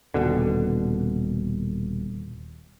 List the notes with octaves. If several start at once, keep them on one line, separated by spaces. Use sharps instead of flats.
D#1 B2 D3